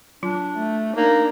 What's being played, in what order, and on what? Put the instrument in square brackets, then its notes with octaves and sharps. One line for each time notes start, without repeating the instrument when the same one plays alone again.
[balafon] F#3 F4 [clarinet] D4
[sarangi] A3
[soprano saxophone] A#3 [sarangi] D4 [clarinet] D#4